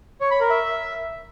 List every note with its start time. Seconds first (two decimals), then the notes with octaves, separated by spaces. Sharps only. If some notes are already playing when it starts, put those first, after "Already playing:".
0.21 C#5
0.31 B5
0.40 A#4
0.50 E5